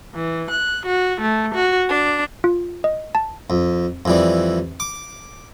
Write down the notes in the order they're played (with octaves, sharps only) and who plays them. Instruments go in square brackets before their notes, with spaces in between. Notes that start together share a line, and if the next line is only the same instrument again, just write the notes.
[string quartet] E3
F#6
F#4
A3
F#4
D4
[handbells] F4
D#5
A5
[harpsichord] F2
F2 E3 G3
D6